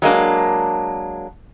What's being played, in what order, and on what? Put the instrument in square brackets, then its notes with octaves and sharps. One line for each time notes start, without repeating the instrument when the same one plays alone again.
[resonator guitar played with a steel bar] F#3 G#3 A#3 D4